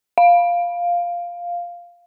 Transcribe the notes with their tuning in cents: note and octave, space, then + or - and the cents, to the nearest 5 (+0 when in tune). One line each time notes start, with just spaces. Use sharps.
F5 +0